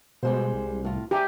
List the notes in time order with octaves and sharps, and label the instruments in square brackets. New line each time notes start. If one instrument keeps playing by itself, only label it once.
[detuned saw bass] B2 [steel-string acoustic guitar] G3 G#3 C5
[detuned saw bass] C2
[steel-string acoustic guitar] A2 F4
[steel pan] G4 [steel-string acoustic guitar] E5 G#5 A#5